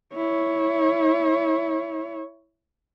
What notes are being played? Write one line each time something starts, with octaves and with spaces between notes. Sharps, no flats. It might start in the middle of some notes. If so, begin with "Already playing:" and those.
E4 C#5